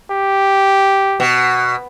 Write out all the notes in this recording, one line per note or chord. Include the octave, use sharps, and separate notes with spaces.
G4
B2